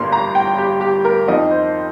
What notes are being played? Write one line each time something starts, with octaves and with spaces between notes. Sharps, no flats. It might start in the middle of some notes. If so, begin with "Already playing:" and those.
Already playing: G1 G2 A#3 C6
A#5
G5
G4
G4
A#4
F2 F3 D#4 D#5
C5